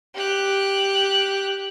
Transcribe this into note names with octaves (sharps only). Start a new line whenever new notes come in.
G4 F#6